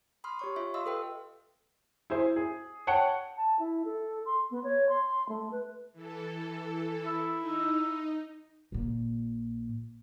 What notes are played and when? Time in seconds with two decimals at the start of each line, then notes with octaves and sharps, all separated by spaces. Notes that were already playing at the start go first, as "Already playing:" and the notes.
0.24 B5 C6 D#6 F6
0.39 G4 C#5 C#6
0.56 F4 E5
0.74 D#5 F5 C6 D#6 E6
0.86 A4 B4 G5
2.10 E4 G#4 C5 E5
2.36 G#4
2.87 C#5 F#5 G5 A5 C#7
3.37 A5
3.59 E4
3.85 A4
4.26 C6
4.51 B3
4.64 C#5
4.89 C6
5.29 A3
5.51 B4
5.93 E3 A4
7.06 E4
7.39 D#4
8.72 A#1 A#2